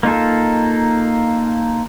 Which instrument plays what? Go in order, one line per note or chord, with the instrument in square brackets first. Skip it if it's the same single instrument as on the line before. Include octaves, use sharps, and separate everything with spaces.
[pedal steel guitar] A#3 D#4 F4 A4